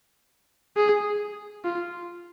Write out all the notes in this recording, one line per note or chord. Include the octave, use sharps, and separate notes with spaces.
G#4
F4